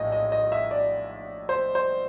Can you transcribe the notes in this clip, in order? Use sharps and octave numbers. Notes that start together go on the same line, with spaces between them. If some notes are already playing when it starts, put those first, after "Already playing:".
Already playing: A#1 A2 D#5
D#5
D#5
E5
D5
C5
C5